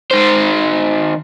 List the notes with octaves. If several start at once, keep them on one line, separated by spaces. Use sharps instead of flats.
D#3 C5